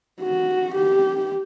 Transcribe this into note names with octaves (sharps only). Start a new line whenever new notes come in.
F#4
G4